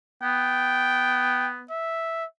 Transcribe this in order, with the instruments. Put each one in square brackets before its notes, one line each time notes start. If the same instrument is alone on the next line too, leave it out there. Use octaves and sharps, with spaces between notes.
[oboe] B3 [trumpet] G5
[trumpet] E5